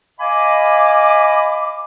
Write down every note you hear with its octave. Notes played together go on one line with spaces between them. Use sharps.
D#5 F5 G#5 B5 D6